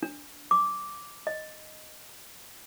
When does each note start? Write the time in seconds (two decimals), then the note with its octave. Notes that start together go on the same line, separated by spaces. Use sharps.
0.03 D4
0.51 D6
1.27 D#5